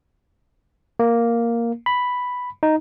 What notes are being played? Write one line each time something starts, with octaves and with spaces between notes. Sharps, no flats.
A#3
B5
D#4